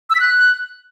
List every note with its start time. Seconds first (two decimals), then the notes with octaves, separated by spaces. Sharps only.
0.10 E6
0.15 B6
0.20 F#6